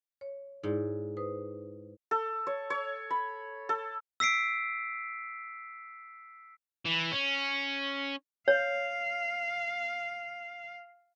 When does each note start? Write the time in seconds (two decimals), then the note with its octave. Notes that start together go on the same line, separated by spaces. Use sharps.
0.21 C#5
0.63 G#2 D#4 E4 D5
1.17 B4 C5 D#6
2.11 A4
2.47 C#5
2.70 C#5
3.10 B5
3.69 A4
4.20 E6 B6 C7 D7
6.85 E3
7.12 C#4
8.48 C#5 F5